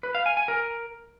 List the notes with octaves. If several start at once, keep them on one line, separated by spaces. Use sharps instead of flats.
B4
F5
G#5
G#5
A#4